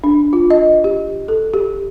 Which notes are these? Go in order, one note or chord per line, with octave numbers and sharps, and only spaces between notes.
D4
F4
D#5
G4
A4
G4